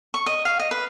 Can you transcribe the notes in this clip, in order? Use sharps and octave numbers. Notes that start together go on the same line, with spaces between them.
C#6
D#5
F5
D#5
B4